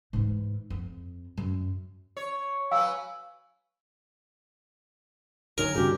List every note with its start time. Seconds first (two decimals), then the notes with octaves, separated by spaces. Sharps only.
0.13 G#2 E3
0.70 F2
1.37 F#2
2.17 C#5
2.71 F#3 B4 F5 G#5 E6
5.58 D2 D#3 F#3 A#4 G#5
5.75 D2 G2 C#3 F#4 G4